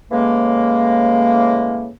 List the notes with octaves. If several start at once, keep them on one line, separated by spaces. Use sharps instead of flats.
A2 C#3 E3 G#3 A#3